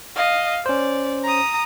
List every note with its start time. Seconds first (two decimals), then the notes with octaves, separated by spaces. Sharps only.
0.16 D#5 F5
0.66 C#4 C5 D5
1.23 A#5 D#6